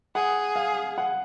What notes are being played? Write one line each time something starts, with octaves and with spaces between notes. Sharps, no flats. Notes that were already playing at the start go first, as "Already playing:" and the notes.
G#4 F#5
F5
F#5